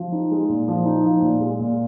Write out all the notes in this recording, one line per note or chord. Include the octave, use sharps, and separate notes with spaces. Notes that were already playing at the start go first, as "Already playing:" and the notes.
Already playing: F3
D#4
G#3
A#2
F3
D#4
F3
A#2
G#3
A#2